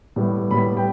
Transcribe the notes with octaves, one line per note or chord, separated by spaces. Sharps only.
A2 G3 B3
A2 G3 B3 B5
G5